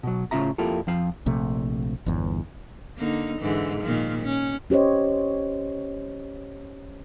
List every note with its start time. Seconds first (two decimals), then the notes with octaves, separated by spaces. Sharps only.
0.03 B2 F#3
0.31 A2 C#3 C#4 F4 E5 A#5
0.58 F2 A#3 E4 F4 G4 A4
0.87 F2 F3 F5
1.26 A#1 C3 A3
2.06 G1 E2
2.98 D3 A#3 D#4
3.40 G#2 D3 E3
3.81 A#2 D#3 F3
4.23 C#4
4.70 C#4 G4 C5 C#5 D#5